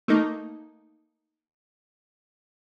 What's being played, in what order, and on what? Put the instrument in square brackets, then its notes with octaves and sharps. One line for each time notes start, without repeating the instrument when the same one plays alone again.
[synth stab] A3 A#3 D#4